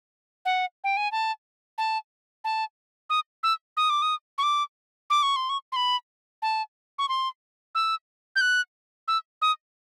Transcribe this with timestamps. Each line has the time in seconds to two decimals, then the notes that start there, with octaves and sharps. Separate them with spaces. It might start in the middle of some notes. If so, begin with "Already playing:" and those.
0.45 F#5
0.84 G5
0.97 G#5
1.12 A5
1.78 A5
2.44 A5
3.10 D#6
3.43 E6
3.77 D#6
3.90 D6
4.02 D#6
4.38 C#6
4.43 D6
5.10 D6
5.23 C#6
5.36 C6
5.49 C#6
5.72 C6
5.76 B5
6.42 A5
6.99 C#6
7.09 C6
7.75 E6
8.36 G6
8.41 F#6
9.08 E6
9.42 D#6